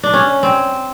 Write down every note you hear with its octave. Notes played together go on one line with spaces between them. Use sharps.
D4
C#4
C4